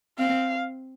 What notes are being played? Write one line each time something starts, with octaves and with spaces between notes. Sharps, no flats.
C4 F5